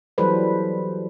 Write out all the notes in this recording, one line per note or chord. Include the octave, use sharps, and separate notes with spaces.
E3 F#3 G3 A4 B4 C5